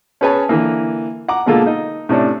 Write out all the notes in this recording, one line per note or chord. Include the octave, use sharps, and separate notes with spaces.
C#4 G#4 B4 C#5 G#5 A5
D3 E3 A#3
F#5 A#5 D6
B2 D3 G#3 A#3 F4 A4
D#4 D#5
A2 C3 C#4 D4